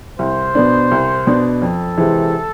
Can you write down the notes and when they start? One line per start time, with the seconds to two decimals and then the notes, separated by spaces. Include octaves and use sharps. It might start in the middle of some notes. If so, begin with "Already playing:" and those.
0.19 C2 C5
0.55 B2 B3 D4
0.91 C2
1.27 B2 B3 D4
1.61 F2 A4
1.98 C3 E3 G#3 C4